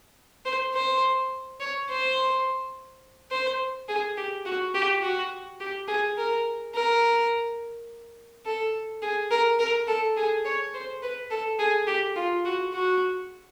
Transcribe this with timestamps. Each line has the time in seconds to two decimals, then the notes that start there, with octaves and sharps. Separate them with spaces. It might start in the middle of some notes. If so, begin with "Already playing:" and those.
0.45 C5
0.74 C5
1.60 C#5
1.89 C5
3.31 C5
3.89 G#4
4.17 G4
4.46 F#4
4.74 G4
5.02 F#4
5.60 G4
5.88 G#4
6.17 A#4
6.74 A#4
8.45 A4
9.02 G#4
9.31 A#4
9.59 A#4
9.87 A4
10.17 G#4
10.45 C#5
10.74 C5
11.03 B4
11.31 A4
11.59 G#4
11.87 G4
12.16 F4
12.45 F#4
12.73 F#4